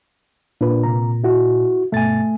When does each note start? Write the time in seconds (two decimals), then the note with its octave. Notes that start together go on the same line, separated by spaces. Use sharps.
0.61 A#2 D4 B4
0.84 C3 A#5
1.24 E4 F#4
1.92 G2 B2 A3 G#5 A6